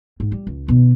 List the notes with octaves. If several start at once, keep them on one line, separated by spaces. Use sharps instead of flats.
G#2
G3
C#2
B2 D#3